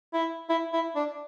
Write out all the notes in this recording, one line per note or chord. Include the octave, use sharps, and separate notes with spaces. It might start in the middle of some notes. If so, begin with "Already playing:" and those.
E4
E4
E4
D4